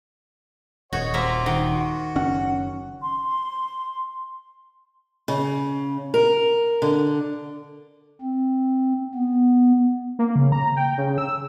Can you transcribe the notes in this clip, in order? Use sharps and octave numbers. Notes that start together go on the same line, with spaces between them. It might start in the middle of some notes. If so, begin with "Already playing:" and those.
D#1 F#4 C#5 D#5 F#5
A#3 C4 F4 E5
D#3 F#5
F#4
F#1 C#4 F#5
C6
C#3
A#4
D3
C4
B3
A#3
C#3
A#5
G5
C#3
E6